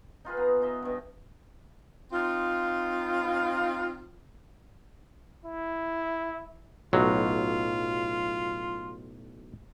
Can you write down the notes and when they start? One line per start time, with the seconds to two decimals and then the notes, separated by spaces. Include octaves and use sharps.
0.25 D#4 F4 G#4 B4
0.37 B3 A#5
0.62 D#4 D#5 E5
0.82 G2 B2
2.12 C4 D#4 F4
5.46 E4
6.93 B1 A2 F#3 F4